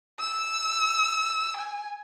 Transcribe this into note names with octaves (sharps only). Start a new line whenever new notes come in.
E6
G#5